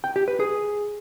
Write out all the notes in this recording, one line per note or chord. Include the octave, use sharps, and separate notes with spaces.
G5
G4
B4
G#4